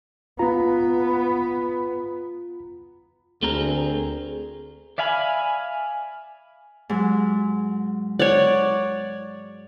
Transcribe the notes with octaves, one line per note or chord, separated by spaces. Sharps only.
B3 F4 A#5
D2 A3 C4 G#4 A#4
D5 E5 F5 G#5 B5
G#2 F#3
C#5 D5 F#5